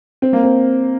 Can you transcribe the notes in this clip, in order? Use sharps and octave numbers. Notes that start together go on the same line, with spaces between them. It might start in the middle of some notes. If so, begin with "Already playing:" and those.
C4
A#3
C4